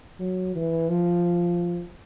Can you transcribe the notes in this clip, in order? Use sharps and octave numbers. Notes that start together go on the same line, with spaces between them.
F#3
E3
F3